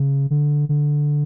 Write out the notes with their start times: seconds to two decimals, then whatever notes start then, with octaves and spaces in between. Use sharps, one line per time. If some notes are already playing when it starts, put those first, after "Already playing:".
Already playing: C#3
0.30 D3
0.69 D3